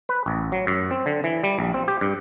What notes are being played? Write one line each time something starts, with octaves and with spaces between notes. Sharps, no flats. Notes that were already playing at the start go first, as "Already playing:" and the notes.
B4
A1
F#3
F#2
C4
D3
E3
G3
A#1
C4
G4
G2